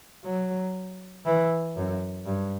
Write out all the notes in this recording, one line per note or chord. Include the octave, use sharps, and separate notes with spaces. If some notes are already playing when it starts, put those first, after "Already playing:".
F#3
E3
F#2
G2